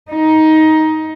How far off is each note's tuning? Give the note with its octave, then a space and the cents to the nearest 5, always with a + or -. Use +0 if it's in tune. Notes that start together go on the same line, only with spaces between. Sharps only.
D#4 +15